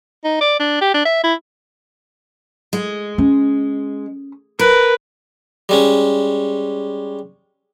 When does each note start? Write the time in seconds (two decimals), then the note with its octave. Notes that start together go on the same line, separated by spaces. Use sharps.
0.25 D#4
0.41 D5
0.60 D4
0.81 G4
0.94 D4
1.06 E5
1.24 E4
2.73 G#3
3.18 C#4
4.59 A#4 B4
5.69 G3 G#3 C#4